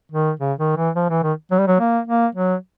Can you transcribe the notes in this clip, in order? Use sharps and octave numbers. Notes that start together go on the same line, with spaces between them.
D#3
C#3
D#3
E3
F3
E3
D#3
F#3
G3
F#3
A#3
A#3
F#3